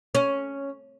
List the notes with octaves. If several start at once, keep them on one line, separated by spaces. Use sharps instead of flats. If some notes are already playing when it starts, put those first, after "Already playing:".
C#4